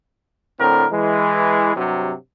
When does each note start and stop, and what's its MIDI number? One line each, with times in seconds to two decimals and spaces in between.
0.60 0.87 45
0.60 0.87 50
0.60 0.87 60
0.60 0.87 70
0.92 1.76 52
0.92 1.76 56
1.76 2.13 43
1.76 2.13 48
1.76 2.13 54